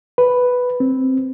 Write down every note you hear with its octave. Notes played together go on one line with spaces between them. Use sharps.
B4
C4